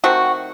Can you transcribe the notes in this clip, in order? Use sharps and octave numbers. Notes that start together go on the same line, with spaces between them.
D#3 A3 C4 F#4